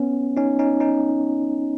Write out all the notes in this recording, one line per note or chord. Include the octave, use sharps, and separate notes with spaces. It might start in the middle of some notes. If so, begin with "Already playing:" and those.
Already playing: B3 C#4
C#4 D#4
C#4 D#4
C#4 D#4